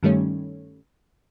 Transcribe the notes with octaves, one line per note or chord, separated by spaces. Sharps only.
G2 D#3 G3 A3 C#4